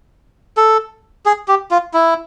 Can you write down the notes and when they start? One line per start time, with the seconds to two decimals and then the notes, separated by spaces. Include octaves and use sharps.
0.57 A4
1.26 G#4
1.48 G4
1.71 F4
1.94 E4